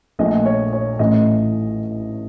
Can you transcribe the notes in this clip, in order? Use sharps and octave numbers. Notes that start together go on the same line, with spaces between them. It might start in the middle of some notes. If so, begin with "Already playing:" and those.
A#1 A#2 A3 D#5
C#5
C#5
A1 A2 A3 D#5